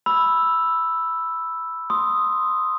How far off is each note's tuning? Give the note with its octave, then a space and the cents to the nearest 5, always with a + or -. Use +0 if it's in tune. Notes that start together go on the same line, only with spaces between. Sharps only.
B5 +0 E6 +0
C6 +0 D#6 +0